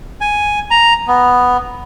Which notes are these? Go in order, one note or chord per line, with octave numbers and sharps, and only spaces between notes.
G#5
A#5
B3